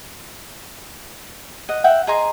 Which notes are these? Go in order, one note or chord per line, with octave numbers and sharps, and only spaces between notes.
D#5 F#5
E5 F#5 G5
G#4 D#5 A#5 C6